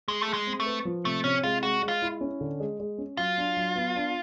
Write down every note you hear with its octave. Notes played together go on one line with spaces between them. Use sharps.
G#3 G#4
A3
G#4
G#3
C4
A3
B4
F3
C3 A3
C3 C#4
G#3 F4
G#3 F#4
G#3
F4
E4
C#4
D3
G#3
G#3
C#4
F#3 F4
D4
F#3
B3
D4